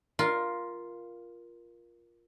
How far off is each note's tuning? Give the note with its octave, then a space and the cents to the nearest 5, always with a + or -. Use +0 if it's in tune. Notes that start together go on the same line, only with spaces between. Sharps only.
F4 +0 A#4 +15